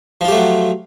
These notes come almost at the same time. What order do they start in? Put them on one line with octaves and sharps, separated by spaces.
F3 F4 G4 A3 F#3